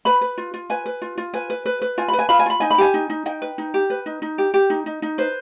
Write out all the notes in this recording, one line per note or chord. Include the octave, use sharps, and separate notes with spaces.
B4 B5
B4
F4
F4
B4 G#5
B4
F4
F4
B4 G#5
B4
B4
B4
F4 G#5
B5
B4
G#5
F4 B5
G#5
F4 B5
D#4 G#5
B5
G4 G#5
D#4
D#4
D#4 G5
B4
D#4
G4
B4
D#4
D#4
G4
G4
D#4
D#4
D#4
B4 C5